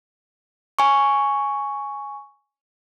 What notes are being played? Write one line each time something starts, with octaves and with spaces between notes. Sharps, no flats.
G#5 C#6